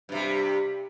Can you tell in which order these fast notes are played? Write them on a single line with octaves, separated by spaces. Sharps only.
G2 C3 G3